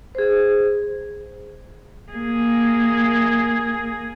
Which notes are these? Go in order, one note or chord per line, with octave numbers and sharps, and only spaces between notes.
G#4 C5
A#3 G#4